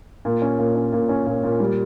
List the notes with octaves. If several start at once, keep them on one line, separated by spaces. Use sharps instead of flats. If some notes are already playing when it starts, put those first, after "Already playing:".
A#2
C#4
A#2
C#4
A#2
C#4
A#2
A#2
G3